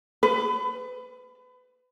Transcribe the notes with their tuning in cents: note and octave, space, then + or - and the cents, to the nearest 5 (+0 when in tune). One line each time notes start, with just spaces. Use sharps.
B4 +30